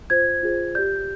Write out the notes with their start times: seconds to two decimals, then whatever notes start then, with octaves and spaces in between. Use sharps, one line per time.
0.10 F4 C5 G#6
0.43 F4 G#4 C5
0.75 G4 D5 G6